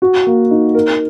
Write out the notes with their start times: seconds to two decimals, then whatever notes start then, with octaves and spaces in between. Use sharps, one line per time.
0.02 F#4
0.26 A#3
0.51 D#4
0.74 A#4